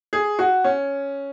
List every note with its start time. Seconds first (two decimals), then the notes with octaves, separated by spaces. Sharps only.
0.13 G#4
0.39 F#4
0.64 C#4